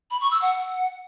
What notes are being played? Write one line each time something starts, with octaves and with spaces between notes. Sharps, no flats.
B5
C#6
E6
F#5